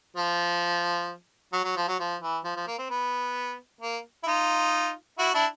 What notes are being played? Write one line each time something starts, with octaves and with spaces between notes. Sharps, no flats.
F3
F#3
F#3
F3
F#3
F3
E3
F3
F3
A#3
C4
B3
A#3
E4
D#4 F4
E4 F#4
D4 E4